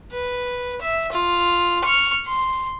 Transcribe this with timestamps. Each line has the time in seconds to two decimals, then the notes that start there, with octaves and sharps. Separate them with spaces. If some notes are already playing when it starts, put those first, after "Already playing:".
0.11 B4
0.81 E5
1.12 F4
1.84 C#6 F6
2.26 C6